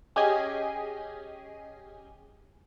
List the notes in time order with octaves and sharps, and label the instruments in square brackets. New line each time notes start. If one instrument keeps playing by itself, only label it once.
[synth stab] C#4 G4 G#4 D#5 G#5